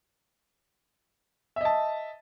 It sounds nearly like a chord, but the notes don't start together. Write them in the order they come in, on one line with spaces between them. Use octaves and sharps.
E5 D#5 A5